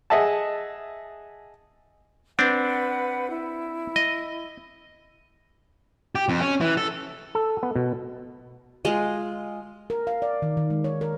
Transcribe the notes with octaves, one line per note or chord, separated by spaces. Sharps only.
G#4 D#5 E5 F#5 A5
C4 D4 B4 F#5
E4
D#5
G4
F2
C#4
E3
A4
A4
B3
B2
G#3 F4 D#5
A#4
F5
D5
D#3
D#3
G#3
C#5
A#4